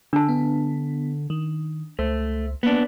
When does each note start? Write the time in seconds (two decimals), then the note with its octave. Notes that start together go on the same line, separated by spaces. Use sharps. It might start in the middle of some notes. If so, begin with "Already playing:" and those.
0.13 D3 D4 A5 E6
0.29 B3
1.30 D#3
1.99 C#2 A3 C5
2.63 A#3 B3 D4